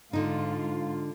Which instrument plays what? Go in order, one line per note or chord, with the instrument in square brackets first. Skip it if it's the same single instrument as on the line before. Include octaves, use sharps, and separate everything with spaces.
[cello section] G#2 F4 [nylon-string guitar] D3 D#4